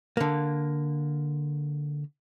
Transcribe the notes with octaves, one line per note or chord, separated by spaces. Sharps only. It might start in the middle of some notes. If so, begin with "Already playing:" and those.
D3 A#3